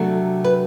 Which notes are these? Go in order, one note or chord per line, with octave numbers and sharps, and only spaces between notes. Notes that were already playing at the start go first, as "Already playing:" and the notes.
Already playing: C3 F#3 A3 D4
B4